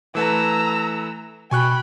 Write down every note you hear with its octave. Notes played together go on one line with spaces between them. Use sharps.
E3 A3 B4 A#5 E6
B2 G5 G#5 B5 C#6 F#6